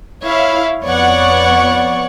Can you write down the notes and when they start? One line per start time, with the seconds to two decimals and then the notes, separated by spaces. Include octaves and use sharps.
0.22 E4 C#5 E5 F5
0.84 F2 B3 C#5 D5 F#5 C#6